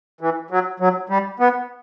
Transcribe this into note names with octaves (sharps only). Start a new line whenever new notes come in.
E3
F#3
F#3
G3
B3